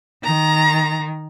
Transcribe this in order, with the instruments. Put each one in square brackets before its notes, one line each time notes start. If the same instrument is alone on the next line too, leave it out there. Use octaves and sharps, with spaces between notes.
[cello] D#3 [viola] A#5